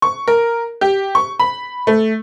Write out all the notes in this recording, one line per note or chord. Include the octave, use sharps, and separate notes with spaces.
C#6
A#4
G4
C#6
B5
A3